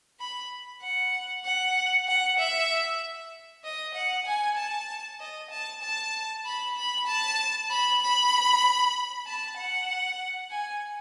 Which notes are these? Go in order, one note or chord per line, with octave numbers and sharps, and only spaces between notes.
B5
F#5
F#5
F#5
E5
D#5
F#5
G#5
A5
D#5
A5
A5
B5
B5
A5
B5
B5
A5
F#5
G#5